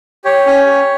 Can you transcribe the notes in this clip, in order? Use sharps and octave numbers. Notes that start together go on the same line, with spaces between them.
G4 C#5
C#4
G4